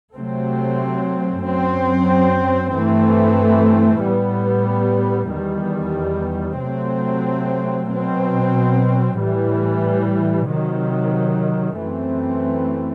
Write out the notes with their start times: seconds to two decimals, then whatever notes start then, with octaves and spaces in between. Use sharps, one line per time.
0.15 C3 F#3 A3 C4
1.43 F#2 F#3 C4
2.73 G2 E3 A3 C4
4.02 A2 G3 B3
5.32 E2 D#3 G3
6.61 C3 F#3 A3 C4
7.90 B2 F#3 C4
9.21 A2 E3 G3
10.50 C3 D#3 F#3
11.79 F#2 E3 A3 C4